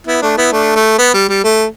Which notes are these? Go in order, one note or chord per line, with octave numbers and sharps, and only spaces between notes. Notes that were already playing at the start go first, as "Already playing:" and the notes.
B3 E4
A3 D4
B3 E4
A3 D4
A3
B3
G3
G3
A3